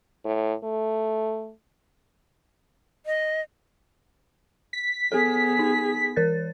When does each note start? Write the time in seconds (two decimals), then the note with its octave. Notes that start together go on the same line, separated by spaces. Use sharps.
0.25 A2
0.63 A3
3.06 D#5
4.73 B6
5.12 B3 G#4 A4
5.59 D#4
6.16 E3 A#4 A6